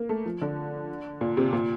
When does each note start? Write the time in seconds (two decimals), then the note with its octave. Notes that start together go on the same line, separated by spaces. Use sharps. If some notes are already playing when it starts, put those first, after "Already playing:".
Already playing: A#3
0.09 A3
0.26 F3
0.42 D3
1.21 A#2
1.37 C3
1.53 A#2